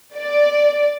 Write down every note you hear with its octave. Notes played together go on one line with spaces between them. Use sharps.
D5